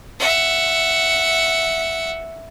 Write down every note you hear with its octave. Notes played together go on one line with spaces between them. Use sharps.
E5 F#5